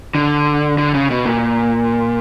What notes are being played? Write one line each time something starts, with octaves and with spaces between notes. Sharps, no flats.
D3
D3
C#3
B2
A#2